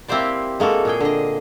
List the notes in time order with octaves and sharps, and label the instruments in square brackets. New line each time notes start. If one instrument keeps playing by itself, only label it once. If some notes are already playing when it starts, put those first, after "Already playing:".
[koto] A#3 C4 E4 G4 C5 D5
G#3 A#3 F#4 A4
A#2 G#4 G5
D3 D#5